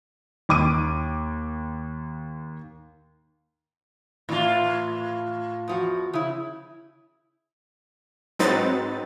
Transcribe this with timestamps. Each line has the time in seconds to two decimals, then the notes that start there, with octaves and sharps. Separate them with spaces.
0.49 D#2 D6 D#7
4.29 A2 E3 F4
5.68 E2 F3 F#4
6.13 C#3 E4
8.39 G#2 F#3 C4 D#4 B4 A6